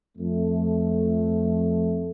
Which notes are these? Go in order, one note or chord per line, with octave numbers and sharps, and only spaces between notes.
F2 A3